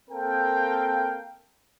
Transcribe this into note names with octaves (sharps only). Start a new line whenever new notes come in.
A#3 C4 A4 A#4 F5 G5